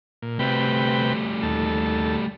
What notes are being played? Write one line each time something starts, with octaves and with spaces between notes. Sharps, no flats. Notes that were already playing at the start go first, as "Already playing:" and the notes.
A#2
C3 G3 A3 B4 G5
D#2 A4